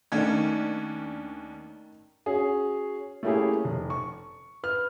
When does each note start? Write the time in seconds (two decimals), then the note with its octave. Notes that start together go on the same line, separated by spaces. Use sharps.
0.12 D#2 D#3 A3 C#4 D4 G#6
2.26 C#4 F#4 G#4
3.23 A3 A#3 C#4 E4 G4 G#4
3.64 F1
3.90 C#6
4.63 B4 F6